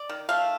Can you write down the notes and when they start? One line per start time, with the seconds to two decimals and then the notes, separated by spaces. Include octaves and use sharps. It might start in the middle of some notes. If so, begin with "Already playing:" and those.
Already playing: D5
0.09 D#3
0.29 A3 F5